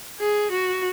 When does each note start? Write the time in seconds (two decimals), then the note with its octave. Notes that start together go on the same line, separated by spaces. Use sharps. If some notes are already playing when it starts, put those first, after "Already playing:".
0.20 G#4
0.51 F#4